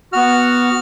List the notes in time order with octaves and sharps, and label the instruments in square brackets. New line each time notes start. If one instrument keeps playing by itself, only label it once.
[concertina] B3 F#4 F6